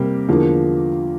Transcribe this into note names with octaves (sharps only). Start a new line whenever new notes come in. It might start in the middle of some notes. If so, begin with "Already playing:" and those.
Already playing: C3 G3 A#3 G4
E2 D3 F3 A#3